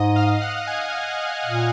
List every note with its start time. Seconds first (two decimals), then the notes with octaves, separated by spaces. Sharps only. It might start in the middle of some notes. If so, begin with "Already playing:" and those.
Already playing: G#2 D#5 D#6
0.16 F5 F6
0.42 F#5 F#6
0.67 G#5 G#6
1.45 A#2